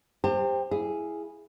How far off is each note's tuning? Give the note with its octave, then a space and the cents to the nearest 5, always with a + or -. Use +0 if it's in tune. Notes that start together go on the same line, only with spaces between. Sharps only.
G4 +25 C5 +0 A5 +45
E4 +0 G#4 +0 F5 +0